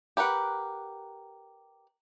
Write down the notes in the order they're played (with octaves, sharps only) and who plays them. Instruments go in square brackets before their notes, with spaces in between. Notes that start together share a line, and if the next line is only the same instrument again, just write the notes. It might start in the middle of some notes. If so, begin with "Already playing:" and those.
[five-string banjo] G4 A#4 B4 F#5